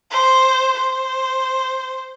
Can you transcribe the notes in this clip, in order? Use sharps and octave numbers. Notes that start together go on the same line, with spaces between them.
C5
C5